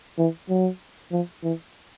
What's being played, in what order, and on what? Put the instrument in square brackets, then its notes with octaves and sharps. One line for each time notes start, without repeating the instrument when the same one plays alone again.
[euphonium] E3
F#3
F3
E3